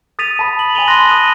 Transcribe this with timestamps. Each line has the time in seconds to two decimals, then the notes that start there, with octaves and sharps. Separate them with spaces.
0.19 D#6 A6 B6 D#7 F7
0.39 A5 B5
0.59 F#7
0.75 G#5 A5 B5 D#7 F7 G7
0.88 C6 F#6 A#6 G7
1.09 D#6 D#7